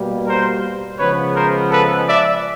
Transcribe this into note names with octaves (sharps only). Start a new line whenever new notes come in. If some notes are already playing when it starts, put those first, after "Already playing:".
Already playing: B2 G3 A#3
A#4 C5
C#3 F3 G#3 B3 B4 C#5
A#4 C5
A4 B4
D5 E5